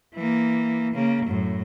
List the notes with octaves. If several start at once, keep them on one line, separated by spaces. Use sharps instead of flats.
E3 A#3
C#3 A#3
F#2 A2